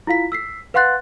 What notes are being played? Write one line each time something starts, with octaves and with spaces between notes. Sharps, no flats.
E4 F4 F5 B6
E6 B6 C7
B4 F5 F#5 C6 F#6 A6